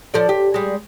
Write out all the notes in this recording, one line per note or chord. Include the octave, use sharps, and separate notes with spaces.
F3 A4 D5
G4
G3 G#3